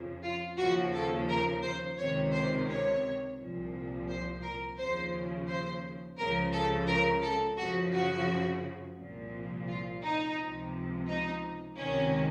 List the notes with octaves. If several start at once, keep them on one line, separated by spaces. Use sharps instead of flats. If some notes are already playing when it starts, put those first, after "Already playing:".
Already playing: F2 C#3 F3
F4
D#2 C#3 F3 F#4
A4
A#4
C5
C#2 C3 D#3 C#5
C5
C#5
C2 A#2 F3
C5
A#4
D#2 C#3 F3 C5
C5
C#2 C#3 F3 A#4
A4
A#4
A4
F#2 C#3 F3 F#4
F#4
C2 A#2 F3
F4
D#4
C#2 C3 F3
D#4
C#2 C3 D#3 C#4